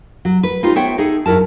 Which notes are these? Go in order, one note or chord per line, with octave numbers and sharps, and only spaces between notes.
F#3
B4
D#4 F4 G4 C5
B3 C5 C#5 E5 G5
D#4 G#4 A4
G2 F#3 E4 A#4 A5